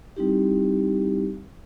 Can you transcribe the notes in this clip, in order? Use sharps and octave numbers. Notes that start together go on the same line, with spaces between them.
G3 C4 D#4 E4 G4